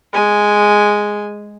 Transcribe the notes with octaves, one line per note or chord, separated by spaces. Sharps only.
G#3 G#5